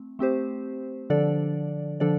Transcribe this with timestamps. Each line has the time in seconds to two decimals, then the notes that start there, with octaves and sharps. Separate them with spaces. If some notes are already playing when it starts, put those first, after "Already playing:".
Already playing: A3 C4
0.19 A3 C4 G4 C5
1.10 D3 F3 D4 A4 D5
2.00 D3 F3 D4 A4 D5